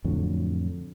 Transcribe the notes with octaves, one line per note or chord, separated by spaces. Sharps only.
F2 A2 D3 F#3